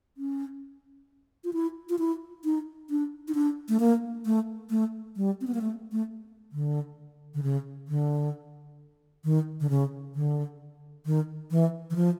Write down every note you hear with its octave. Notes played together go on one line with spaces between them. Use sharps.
C#4
F4
E4
F4
E4
D#4
D4
D#4
D4
A3
A#3
A3
A3
G3
C4
B3
A#3
A3
A3
D3
D3
C#3
D3
D#3
D3
C#3
D3
D#3
E3
E3
F3